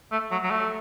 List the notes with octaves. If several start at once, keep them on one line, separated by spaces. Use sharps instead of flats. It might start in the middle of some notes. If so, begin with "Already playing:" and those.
A3
F#3
F#3
A3